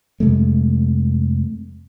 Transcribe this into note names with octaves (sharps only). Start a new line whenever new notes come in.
F2 C3 G#3 A3